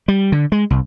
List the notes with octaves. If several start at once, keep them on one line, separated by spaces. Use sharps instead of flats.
G3
D3
G#3
C2